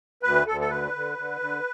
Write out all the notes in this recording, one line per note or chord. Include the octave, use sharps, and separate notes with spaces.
D2 B4
D2 A4
A4
D3 B4
D3
D3
D3